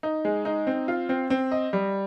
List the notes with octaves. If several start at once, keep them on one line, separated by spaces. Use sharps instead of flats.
D#4
G#3
D#4
C4
F4
C4
C4
D#5
G3